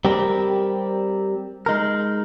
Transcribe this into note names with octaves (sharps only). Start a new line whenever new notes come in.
G3 C4 G4 A#4
G#3 D#4 A#4